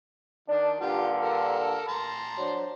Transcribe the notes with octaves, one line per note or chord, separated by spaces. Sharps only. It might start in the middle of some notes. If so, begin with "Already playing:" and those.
D#3 D4
G2 A#2 D3 F4 G4
A4 A#4
A5 A#5 C6
F#3 D4 C5